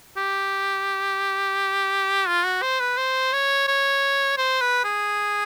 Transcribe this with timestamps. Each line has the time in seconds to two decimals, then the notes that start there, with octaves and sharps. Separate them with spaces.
0.17 G4
2.27 F4
2.45 F#4
2.62 C5
2.80 B4
2.97 C5
3.33 C#5
3.68 C#5
4.37 C5
4.61 B4
4.84 G#4